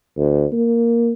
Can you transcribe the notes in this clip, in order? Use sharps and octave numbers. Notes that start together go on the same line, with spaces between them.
D2
A#3